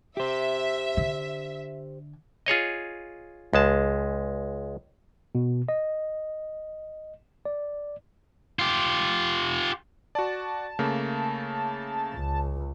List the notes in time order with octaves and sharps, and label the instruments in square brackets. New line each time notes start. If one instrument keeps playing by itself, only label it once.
[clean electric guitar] G4 C5 [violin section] E5
[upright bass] D3
[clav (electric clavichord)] F4 G#4 C#5 D#5
C#2 G#3 A5
[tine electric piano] B2
D#5
D5
[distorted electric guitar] F4 G4
[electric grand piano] F#4 D5 [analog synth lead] A5
[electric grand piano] C#3 A3 A#3
[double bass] C#2